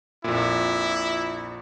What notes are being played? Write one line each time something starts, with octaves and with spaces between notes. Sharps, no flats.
A#1 F2 A#2 E4